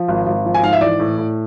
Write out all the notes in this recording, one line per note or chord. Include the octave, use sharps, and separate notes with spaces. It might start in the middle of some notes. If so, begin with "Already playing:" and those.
Already playing: F3
G#1
G#1
F3
G#5
G#2 F5
E5
E3 D5
A2
A2